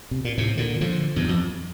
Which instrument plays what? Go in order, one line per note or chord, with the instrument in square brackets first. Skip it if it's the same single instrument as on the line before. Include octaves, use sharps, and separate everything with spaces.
[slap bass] C3
A#2
A2 C3
A#2 D3
D3 F3
E2 G2
F2